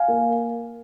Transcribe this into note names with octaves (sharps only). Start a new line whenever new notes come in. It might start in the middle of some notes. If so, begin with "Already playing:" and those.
Already playing: F5 G#5
A#3